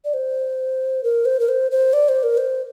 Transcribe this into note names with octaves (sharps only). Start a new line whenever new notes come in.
D5
C5
A#4
C5
A#4
C5
C5
D5
C5
A#4
C5